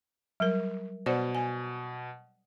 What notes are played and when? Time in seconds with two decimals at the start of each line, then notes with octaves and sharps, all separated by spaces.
0.40 F#3 G3 A#4
1.06 B2 C5 D5 F#5
1.35 G#5